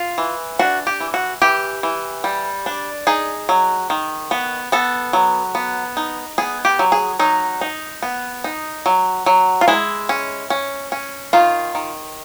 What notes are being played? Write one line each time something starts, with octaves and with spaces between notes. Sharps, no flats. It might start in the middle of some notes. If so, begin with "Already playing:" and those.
Already playing: F4
E3
D4 F#4
G4
E3
F#4
E3 G4
E3
G3
D4
D#4 G#4
F#3
D#3
B3
B3 A4
F#3
B3
D#4
B3 G#4
G4
F#3
G#4
F#3 D#4
D#4
B3
D#4
F#3
F#3
F4
G#3 E4
C#4
C#4
C#4
D#3 F4
D#3